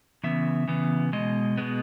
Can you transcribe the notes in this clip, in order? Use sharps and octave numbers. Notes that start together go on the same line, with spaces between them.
C#3 E3 B3 E5
C#3 E3 B3
B2 G#3 D#5
B2 G#3 B3